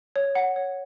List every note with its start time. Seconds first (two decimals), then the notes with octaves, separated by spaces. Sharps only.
0.16 C#5
0.35 F#5
0.56 C#5